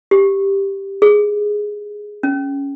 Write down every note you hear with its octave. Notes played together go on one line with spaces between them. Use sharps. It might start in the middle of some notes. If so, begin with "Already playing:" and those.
G4
G#4
C#4